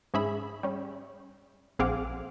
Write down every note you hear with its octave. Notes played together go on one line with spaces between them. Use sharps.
G#2 C#4 G#4 E5 B5
G3 C#4
A#1 C4 G#4 F5 F#5 D6